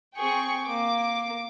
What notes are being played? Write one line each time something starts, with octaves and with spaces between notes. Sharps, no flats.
C4 G#4 G5 C#6
A#3 D6